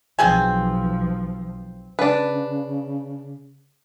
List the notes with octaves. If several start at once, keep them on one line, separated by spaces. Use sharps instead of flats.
B1 F3 C4 G#4 G#5
C#3 D4 B4